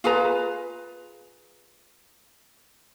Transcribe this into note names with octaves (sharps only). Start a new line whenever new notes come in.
F4 G#4 B4 A#5